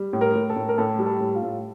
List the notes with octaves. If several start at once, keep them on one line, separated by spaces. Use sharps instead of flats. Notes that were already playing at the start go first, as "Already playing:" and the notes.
Already playing: G3
A2
A#4
A2
A4
A2
A#4
A2 A4
G3
A4
A2
F4
A2